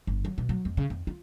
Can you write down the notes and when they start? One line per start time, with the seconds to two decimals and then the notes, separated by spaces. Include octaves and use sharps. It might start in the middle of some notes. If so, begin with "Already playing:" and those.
0.07 G1
0.25 F#3
0.38 B2
0.49 F#3
0.65 F2
0.77 C#3
0.90 F2
1.07 F4